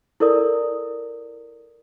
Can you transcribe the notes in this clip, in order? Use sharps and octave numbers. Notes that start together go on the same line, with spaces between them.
E4 A4 A#4 D5 D#6